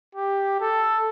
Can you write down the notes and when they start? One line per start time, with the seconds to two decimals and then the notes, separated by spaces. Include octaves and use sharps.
0.15 G4
0.61 A4